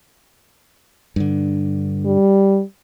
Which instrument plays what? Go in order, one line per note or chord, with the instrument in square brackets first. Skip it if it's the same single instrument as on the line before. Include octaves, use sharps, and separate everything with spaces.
[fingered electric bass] G2 D3
[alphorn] G3